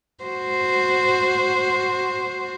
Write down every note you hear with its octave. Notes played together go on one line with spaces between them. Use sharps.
F#4 C5